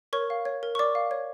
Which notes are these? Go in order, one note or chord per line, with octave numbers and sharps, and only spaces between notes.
A#4 C#5 C#6
F5
C#5
A#4
C#6
A#4 D5 D6
F5
C#5